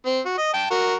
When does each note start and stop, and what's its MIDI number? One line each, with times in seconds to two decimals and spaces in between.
0.06 0.20 60
0.25 0.36 66
0.38 0.51 75
0.54 0.67 79
0.54 0.67 81
0.71 0.95 66
0.71 0.95 70